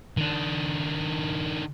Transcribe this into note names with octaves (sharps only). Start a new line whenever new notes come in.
D#3 D4